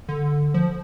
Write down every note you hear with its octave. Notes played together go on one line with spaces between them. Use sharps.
D3
F3